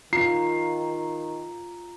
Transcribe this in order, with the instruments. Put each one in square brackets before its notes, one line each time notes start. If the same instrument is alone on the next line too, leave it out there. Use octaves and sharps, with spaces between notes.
[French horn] D#3 [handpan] F4 [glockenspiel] A#5 [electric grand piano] C7